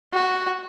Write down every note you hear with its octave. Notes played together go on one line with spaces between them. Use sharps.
F#4